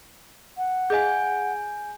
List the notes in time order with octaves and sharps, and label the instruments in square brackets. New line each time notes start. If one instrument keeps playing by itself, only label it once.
[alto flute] F#5
[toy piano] G#4 D#5 F5 [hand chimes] G#5 G6